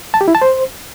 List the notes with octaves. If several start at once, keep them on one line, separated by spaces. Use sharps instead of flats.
A5
G4
E4
A5
C5